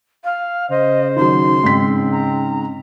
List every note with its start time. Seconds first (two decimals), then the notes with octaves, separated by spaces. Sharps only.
0.24 F5
0.70 C#3 C5 D#5
1.17 D#3 F#3 C6
1.63 G#2 C4 B6
2.11 A#5